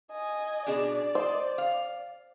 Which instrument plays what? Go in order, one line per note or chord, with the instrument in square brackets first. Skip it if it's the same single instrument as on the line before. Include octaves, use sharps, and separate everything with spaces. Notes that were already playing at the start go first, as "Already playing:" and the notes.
[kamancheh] D#5 G#5
[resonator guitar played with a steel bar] B2 D4 G#4 [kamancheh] D5
[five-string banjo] C5 [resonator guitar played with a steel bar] D#5
[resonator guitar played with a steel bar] F5